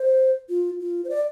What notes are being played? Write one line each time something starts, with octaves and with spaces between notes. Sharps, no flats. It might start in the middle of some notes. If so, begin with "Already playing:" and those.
Already playing: C5
F4
F4
C5
D5